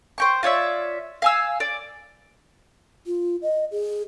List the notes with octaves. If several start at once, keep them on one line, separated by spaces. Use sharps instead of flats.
C5 G5 C#6
F4 C#5 D5 E5
F5 G#5 E6
D5
F4
D#5
G#4